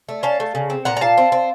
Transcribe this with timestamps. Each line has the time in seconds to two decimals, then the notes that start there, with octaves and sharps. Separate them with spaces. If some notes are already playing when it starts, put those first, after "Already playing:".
0.09 A3
0.23 C#4 F5 A5
0.40 A3
0.55 C#3
0.70 C4
0.85 A#2 F#5 A#5
0.97 A#5
1.01 A#2 F5 A5
1.18 C4
1.32 C4